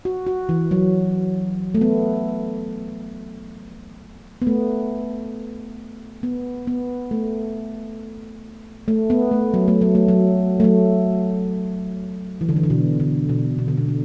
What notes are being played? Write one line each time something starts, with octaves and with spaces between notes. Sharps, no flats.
F#4
F#4
E3
F#3
A3
B3
B3
A3
B3
B3
A3
A3
B3
A3
F#3
A3
F#3
A3
F#3
A3
F#3
E3
D3
E3
D3
B2
D3
B2
B2
D3
B2
B2